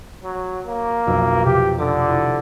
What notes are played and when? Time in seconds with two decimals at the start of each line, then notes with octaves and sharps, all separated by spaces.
0.24 F#3
0.67 A#3
1.07 B1 F2 E6
1.45 C3 G4
1.78 D3 D6 D#6
2.09 E4